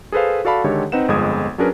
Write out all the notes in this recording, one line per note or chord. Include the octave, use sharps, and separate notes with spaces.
G#4 A4 B4 C5 F5
F#4 A4 D5 F5 A5 B5
D3 D#3 G#3 G4 A4 C#5
C4 D#4 B4 F#5 E7
G1 F2 G#3 D#6 G#6
F#3 C#4 D4 G#4 A#4 B4